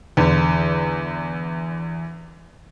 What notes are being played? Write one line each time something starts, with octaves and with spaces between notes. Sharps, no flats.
E2 D3